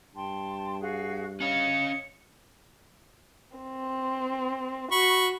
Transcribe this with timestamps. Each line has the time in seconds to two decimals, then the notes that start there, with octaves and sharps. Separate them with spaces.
0.15 G2 G5 A5 C6
0.81 F#4 G#4 F5
1.40 C#4 C#5 D#5 F5 C#7
3.57 C4
4.92 F#4 B5 C#6